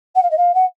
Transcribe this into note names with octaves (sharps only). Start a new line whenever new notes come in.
F#5
F5
D#5
F5
F#5